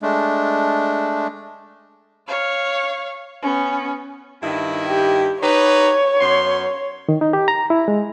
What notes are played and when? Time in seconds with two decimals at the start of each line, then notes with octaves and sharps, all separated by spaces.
0.02 G#3 A3 D4
2.28 C#5 F5
3.42 B3 C#4
4.43 G2 D#3 E4
4.88 G4
5.43 D#4 G4 B4 C#5
6.20 F#2 B3 C6
7.09 D#3
7.21 D#4
7.33 G4
7.48 A#5
7.70 E4
7.88 G#3